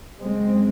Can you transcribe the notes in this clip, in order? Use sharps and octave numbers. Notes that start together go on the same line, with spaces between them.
F#2 C#3 G#3 C4